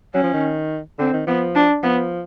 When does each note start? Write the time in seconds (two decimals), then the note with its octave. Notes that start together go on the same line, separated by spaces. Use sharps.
0.14 F#3 C#4
0.23 F3
0.33 D#3
0.99 D3 C4
1.13 D#3
1.27 F3 B3
1.55 D4
1.83 F3 B3